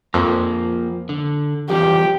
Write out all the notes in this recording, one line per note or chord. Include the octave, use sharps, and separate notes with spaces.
F2 F3 A#3
D3
E2 F3 G3 G4